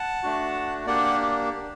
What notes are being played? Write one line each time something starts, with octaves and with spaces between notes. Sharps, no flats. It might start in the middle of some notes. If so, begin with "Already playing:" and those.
Already playing: F#5 A5
A3 D4 F#4
A#3 D4 G4 D5 F#5